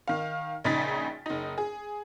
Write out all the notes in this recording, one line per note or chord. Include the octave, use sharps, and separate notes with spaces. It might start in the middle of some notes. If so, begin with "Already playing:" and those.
D#3 F5
A#1 C#3 D#4 A6 B6
F#1 D#4
G#4